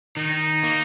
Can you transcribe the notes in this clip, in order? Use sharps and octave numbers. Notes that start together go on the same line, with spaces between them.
D#3 D#4
A#3